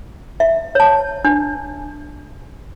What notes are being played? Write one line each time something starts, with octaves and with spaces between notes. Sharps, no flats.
E5
C#5 A5
D4